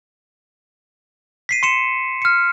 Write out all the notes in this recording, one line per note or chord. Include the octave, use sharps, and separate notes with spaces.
B6 C7 D#7
C6 C#7 E7
F6 C#7